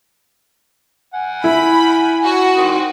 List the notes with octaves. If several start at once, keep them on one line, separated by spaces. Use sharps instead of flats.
F#5 G#5
E4 B5
F#4
D#3 C4 D#6